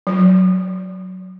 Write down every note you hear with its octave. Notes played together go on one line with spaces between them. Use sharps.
F#3